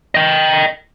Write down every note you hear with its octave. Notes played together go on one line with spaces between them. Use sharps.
D#5 G5